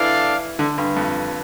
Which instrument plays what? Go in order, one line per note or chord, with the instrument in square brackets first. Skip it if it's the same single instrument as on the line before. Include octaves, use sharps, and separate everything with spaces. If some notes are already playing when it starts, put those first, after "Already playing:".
Already playing: [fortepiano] E3 [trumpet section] D4 A4 D5 F5
[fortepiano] D3
G2
F2